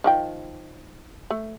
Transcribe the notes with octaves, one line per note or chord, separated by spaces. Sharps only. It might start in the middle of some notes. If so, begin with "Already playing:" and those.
D#3 F3 G5
A3